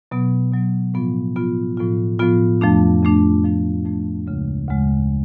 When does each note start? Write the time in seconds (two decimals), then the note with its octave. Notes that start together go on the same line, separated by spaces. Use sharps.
0.11 B2 F#3 B3
0.52 B2 F#3 B3
0.94 A2 F3 B3 F4
1.36 A2 F3 B3 F4
1.77 A2 F3 B3 F4
2.19 A2 F3 B3 F4
2.61 F2 F3 A3 D4
3.03 F2 F3 A3 D4
3.44 F2 F3 A3 D4
3.85 F2 F3 A3 D4
4.27 D2 C#3 G#3
4.68 D2 C#3 G#3